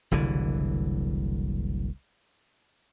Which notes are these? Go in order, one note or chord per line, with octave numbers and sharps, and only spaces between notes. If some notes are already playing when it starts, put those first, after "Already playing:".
F#1 C2 D3 E3